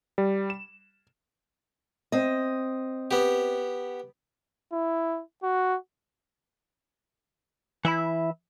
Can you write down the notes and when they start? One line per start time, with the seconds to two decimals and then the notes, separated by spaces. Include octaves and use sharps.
0.18 G3
0.50 E7
2.12 C4 D#5
3.11 B3 G4
4.73 E4
5.43 F#4
7.85 E3 E4 E5 B5